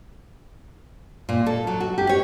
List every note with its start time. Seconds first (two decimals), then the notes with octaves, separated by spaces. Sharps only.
1.29 A#2
1.46 A4
1.67 F#3
1.80 F#4
1.98 G4
2.09 C#5